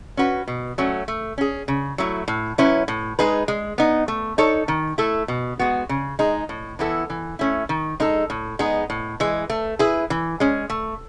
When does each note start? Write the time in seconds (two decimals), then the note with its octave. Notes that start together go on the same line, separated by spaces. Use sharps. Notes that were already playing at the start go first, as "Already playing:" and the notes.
0.17 C#4 F#4 B4
0.48 B2
0.78 F#3 A3 C#4 F#4
1.08 A3
1.38 C#4 G#4
1.68 C#3
1.98 F#3 A3 E4
2.28 A2
2.58 F#3 C#4 E4 B4
2.88 A2
3.19 G#3 D#4 G#4 B4
3.48 G#3
3.78 B3 D#4
4.08 A3
4.38 D#4 A4 C#5
4.68 D#3
4.98 A3 E4 A4
5.28 B2
5.59 G#3 B3 F#4
5.89 C#3
6.19 G#3 D#4
6.49 A2
6.79 E3 B3 E4 A4
7.10 E3
7.39 A3 C#4 E4
7.69 D#3
8.00 G#3 D#4 A4
8.30 A2
8.59 G#3 B3 D#4
8.90 A2
9.20 E3 G#3
9.50 A3
9.79 E4 G#4 B4
10.10 E3
10.40 G#3 C#4
10.70 A3